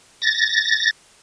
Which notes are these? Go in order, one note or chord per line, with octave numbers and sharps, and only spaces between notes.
A6 A#6